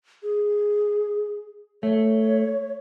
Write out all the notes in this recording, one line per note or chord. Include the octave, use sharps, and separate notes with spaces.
G#4
A3 C#5